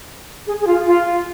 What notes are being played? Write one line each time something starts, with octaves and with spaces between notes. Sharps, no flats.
G#4
G#4
F4
F4